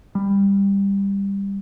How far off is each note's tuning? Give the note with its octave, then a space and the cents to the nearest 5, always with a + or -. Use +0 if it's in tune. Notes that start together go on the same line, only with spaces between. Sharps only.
G3 +15